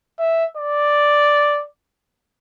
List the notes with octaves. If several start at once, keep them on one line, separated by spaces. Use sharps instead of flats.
E5
D5